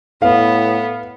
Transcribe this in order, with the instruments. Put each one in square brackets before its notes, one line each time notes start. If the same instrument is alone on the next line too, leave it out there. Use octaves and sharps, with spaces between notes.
[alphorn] A2 [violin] B3 [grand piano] F5